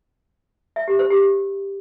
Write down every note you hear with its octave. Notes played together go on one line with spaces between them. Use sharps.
E5
G4
C5
G4